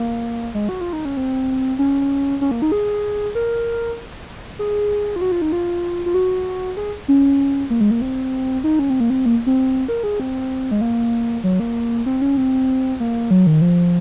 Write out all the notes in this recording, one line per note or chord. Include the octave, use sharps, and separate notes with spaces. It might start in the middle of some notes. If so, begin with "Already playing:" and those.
Already playing: A#3
G#3
F#4
F4
D#4
C#4
C4
C#4
C#4
A#3
D#4
G#4
A#4
G#4
F4
F#4
F4
D#4
F4
F4
F#4
G#4
C#4
A#3
G#3
A#3
C4
D#4
C#4
C4
A#3
C4
A#3
C4
A#4
G#4
C4
G#3
A#3
F#3
A#3
C4
C#4
C4
A#3
F#3
D#3
F3